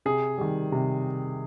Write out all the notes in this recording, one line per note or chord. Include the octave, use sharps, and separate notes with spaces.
C3 G#4
D#3 G3
C3